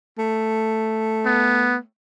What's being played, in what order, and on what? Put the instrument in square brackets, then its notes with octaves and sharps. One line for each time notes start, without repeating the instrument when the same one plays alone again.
[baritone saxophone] A3
[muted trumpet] B3